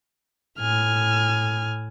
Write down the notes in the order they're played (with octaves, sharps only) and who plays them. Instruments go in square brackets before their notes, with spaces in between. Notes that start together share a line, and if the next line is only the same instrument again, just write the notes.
[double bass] A2 [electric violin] G#5 F6